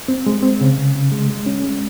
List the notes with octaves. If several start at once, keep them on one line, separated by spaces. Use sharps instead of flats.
C4
G#3
C4
C#3
C#3
C#3
G#3
G#3
C#4
G#3